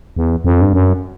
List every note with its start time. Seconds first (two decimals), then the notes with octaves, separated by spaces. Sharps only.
0.16 E2
0.45 F2
0.61 G2
0.73 F#2